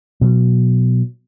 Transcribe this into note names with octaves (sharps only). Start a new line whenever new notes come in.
B2 F#3